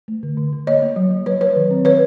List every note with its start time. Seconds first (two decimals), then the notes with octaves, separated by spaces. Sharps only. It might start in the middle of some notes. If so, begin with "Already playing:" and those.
0.08 A3
0.23 D3
0.38 D3
0.53 D3
0.67 A#3 C#5 D#5
0.82 A#3
0.96 F#3
1.11 F#3
1.26 F#3 B4 C#5
1.41 F#3 B4 C#5
1.56 D#3
1.71 C4
1.85 D#3 B4 C#5